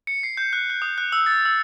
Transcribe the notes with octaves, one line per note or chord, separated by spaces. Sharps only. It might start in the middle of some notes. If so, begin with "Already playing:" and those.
C#7
C7
G6
F#6
F#6
D#6
F#6
E6
A6
E6